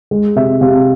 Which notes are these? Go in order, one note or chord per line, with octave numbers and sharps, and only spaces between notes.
G#3
C3 E5
C3 F5